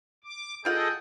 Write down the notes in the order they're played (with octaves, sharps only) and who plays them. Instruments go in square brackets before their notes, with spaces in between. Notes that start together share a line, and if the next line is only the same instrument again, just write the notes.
[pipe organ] D6
[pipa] G3 F4 F#5 [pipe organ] G#4 A4 D#5 [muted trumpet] G5